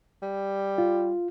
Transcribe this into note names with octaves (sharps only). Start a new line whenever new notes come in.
G3
F4